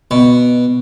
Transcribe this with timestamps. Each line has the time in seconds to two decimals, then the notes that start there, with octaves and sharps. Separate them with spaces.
0.11 B2